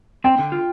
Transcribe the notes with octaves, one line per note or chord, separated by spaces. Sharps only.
C4 G5
D3
F4